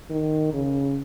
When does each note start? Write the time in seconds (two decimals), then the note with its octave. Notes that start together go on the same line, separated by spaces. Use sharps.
0.10 D#3
0.54 C#3